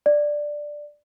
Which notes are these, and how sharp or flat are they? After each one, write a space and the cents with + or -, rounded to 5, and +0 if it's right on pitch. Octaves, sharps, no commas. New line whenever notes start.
D5 +5